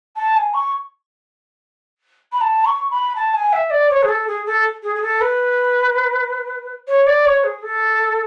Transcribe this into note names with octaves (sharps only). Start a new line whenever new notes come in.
A5
G#5
C#6
B5
A5
C#6
B5
A5
G#5
E5
D5
C#5
G#4
A4
G#4
A4
G#4
G#4
A4
B4
C#5
D5
C#5
G#4
A4